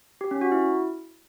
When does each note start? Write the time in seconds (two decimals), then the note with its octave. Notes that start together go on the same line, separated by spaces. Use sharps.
0.21 G4
0.31 C#4
0.41 F#4
0.52 E4